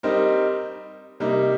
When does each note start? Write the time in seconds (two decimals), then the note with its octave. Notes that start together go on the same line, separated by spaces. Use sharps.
0.03 G3 C4 D#4 A#4
1.20 C3 G3 A#3 D#4